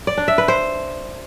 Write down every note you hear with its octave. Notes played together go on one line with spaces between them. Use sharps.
D5
D4
E5
B4
C5